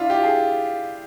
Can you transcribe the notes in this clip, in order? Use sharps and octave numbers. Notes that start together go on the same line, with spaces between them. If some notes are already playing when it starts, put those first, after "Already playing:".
Already playing: D4 E4 F4
G4
G#4